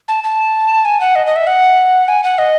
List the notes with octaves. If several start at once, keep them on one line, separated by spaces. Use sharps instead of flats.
A5
A5
G#5
F#5
D#5
D#5
E5
F#5
G#5
F#5
D#5